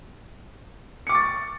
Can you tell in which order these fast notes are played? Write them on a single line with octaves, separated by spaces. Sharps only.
C#7 D6 C#6 A6